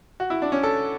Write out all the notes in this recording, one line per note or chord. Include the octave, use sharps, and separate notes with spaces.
F#4
E4
D4
C#4
A4